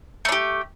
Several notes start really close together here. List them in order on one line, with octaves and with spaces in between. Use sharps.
A3 D4 G4